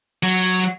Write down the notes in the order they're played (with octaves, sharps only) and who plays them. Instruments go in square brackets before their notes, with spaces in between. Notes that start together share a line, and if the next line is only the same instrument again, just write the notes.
[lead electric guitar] F#3